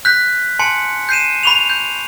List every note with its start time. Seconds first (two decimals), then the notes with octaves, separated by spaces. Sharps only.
0.05 F#6 G6 B6
0.59 G#5 A5 C6 C#7
1.09 G6 C7 D#7 E7
1.43 B5 C#6 F7
1.70 G6